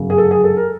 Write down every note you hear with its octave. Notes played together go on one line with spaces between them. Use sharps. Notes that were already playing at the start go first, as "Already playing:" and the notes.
Already playing: G1 F#2 C#3 F#3 A3
G#4
A4
G#4
A4
A#4